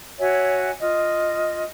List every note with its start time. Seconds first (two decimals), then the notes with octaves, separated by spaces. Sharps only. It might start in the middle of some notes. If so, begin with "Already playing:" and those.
0.20 F#4 C#5 E5 G#5
0.81 F4 D#5